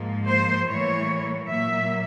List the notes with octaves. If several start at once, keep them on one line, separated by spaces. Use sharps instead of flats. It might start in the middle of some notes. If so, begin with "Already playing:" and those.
Already playing: G#2 F3 A#3
C5
A2 E3 G3 A#3 C#5
A#2 F#3 A#3 E5